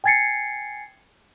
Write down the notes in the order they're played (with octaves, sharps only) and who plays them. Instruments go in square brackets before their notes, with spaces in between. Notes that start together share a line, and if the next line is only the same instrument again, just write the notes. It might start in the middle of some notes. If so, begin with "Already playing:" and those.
[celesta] G5 G#5 G#6 A6 C7 C#7